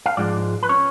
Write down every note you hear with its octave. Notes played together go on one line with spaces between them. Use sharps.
F5
G#2 F3 G#3 D4 D5
B4
C#4 C#5